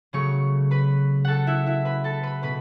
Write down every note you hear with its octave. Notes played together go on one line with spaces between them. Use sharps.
C#3 F#3 A3 C#5 C#6
B4 B5
A4 F#5 A5
E4 E5
E4 E5
B4 B5
A4 A5
B4 B5
B2 B4 B5